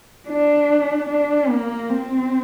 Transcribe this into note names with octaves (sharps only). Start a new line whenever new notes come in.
D4
D4
A#3
C4